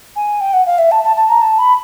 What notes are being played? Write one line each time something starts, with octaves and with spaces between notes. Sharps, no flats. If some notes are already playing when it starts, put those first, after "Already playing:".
G#5
G5
F#5
F5
E5
A5
A5
A5
A#5
A5
B5